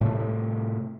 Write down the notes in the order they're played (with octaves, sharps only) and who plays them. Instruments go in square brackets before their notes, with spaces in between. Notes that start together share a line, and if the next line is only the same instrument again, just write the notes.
[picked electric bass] A2 C3 A3